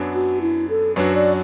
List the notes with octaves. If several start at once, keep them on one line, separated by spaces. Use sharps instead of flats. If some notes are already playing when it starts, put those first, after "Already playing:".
Already playing: F#2 F#3 B3 D4
F#4
E4
A4
F#2 F#3 D4 F#4 B4
D5